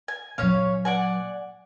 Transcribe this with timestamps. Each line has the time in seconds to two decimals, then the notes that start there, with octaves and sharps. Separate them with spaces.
0.08 G#5
0.38 A#2 F#3 C#4 C#5 F5
0.85 D5 F#5 G#5